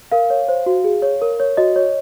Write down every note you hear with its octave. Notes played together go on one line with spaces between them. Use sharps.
A#4 F5
C#5
C5
F#4
G#4
C#5
A#4
C#5
F#4 D#5
C#5